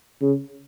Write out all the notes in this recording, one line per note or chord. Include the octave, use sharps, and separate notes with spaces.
C#3